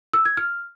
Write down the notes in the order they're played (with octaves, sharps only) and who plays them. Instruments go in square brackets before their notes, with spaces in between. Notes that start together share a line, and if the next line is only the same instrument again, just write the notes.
[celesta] E6
G#6
F6